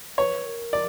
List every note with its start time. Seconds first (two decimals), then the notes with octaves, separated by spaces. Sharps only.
0.18 B4 C#5
0.46 A#4
0.73 D5